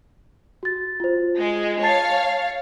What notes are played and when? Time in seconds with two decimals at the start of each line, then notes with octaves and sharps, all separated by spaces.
0.63 F#4 A6
1.00 F4 C5
1.38 G#3
1.83 C#5 F5 A5 A6 C7